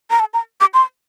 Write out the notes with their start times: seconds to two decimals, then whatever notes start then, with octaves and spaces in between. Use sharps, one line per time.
0.11 A#5
0.20 A5
0.34 A#5
0.61 D6
0.74 C6